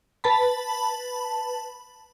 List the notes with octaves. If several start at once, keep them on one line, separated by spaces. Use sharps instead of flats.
B4 A5 B5